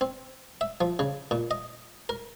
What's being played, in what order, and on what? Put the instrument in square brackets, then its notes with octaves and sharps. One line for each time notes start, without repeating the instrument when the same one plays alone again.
[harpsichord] C4
E5
F3
C#3
A#2
D#5
A#4